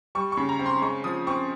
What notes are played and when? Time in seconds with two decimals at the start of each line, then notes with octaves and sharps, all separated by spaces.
0.15 G3 C#6
0.32 C#6
0.37 C#3
0.49 A#5
0.59 C4
0.66 C6
0.82 G#3 C#6
1.04 F3 D#6
1.27 C4 C#6